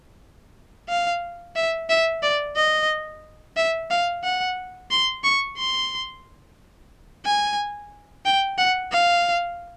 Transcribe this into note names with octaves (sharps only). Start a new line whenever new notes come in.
F5
E5
E5
D5
D#5
E5
F5
F#5
C6
C#6
C6
G#5
G5
F#5
F5